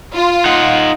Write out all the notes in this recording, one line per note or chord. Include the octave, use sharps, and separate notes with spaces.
F4
D#4 F#5